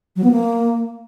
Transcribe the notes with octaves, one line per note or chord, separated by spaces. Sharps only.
F#3
B3
A#3